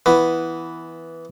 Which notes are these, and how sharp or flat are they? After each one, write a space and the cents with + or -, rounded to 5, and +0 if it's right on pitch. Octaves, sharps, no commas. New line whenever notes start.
E3 +0 B3 +0